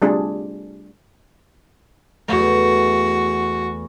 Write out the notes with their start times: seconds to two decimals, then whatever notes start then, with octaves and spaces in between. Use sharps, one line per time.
0.02 G3 A3 C4 D4 F4 G#4
2.28 E2 A3 F#4